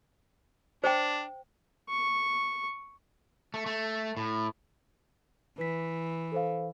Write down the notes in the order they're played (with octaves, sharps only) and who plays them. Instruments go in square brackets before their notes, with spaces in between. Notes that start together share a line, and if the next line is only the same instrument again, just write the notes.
[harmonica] D4 [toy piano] C5 G5
[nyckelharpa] C#6
[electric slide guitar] A3
A3
A2
[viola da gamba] E3 [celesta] B4 B6
[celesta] A4 C5 F5